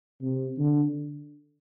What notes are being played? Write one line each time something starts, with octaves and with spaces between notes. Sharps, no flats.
C3
D3